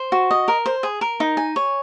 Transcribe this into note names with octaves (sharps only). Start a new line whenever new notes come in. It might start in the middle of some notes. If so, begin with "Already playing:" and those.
Already playing: C5
F#4
D#5
A#4
C5
G#4
A#4
D#4
G#5
C#5